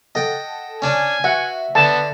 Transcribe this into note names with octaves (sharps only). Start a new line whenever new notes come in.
A4 D#5 F#5 G5 A5
C#4 D4 C#5 G#5
F#4 E5 F#5
D3 B3 A5